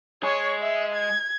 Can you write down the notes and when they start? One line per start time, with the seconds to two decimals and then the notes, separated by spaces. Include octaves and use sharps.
0.23 G#3 G#4 C#5
0.62 E5
0.95 G#6